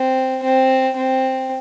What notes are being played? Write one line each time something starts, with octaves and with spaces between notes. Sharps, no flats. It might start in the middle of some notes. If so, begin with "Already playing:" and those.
Already playing: C4
C4
C4